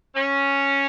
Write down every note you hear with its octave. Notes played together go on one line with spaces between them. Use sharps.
C#4